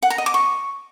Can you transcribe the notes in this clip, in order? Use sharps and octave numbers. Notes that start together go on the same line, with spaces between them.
F#5
A#5
D#5
D6
C#6